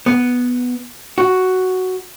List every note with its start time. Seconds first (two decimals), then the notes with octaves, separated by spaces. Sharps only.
0.06 B3
1.18 F#4